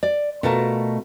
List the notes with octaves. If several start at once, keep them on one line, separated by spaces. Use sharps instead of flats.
D5
B2 A3 F4 A#4 A5